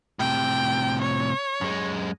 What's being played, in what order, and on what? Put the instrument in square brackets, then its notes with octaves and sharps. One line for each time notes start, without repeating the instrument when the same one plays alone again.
[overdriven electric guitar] A2 C3 [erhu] G5
[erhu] C#5
[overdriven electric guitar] F#2 G#3